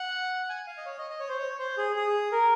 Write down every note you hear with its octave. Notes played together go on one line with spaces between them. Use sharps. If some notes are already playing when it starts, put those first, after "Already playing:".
Already playing: F#5
G#5
F5
D#5
C#5
D#5
D#5
C#5
C5
C#5
C5
G#4
G#4
A#4